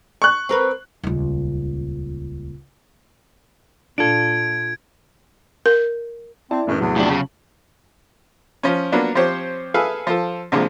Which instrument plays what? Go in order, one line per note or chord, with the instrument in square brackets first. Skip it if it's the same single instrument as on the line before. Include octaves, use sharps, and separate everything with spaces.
[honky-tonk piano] C#6 F#6
[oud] C4 A#4 B4
[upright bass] D#1 C#2
[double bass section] A#2 [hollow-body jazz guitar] D4 F4 A4 [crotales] G#6 D7
[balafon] A#4
[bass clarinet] C4 [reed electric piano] E4 D5 [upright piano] A5
[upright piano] A#1 A2 E3 [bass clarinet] F#2
[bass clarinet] E2 [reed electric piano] C3 F#3
[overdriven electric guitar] A2 D4 [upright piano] F3 G4 F#7
[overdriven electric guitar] C#3
[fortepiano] F3 C#4
F#3 A#3 B3 D4 F4
F3 C4 G4 C5 C#5
G#4 A4 B4 E5 F5 G#5
F3 F4 A4
C2 A#2 D3 F3 G#3